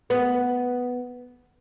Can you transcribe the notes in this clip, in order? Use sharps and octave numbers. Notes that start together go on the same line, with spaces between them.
B3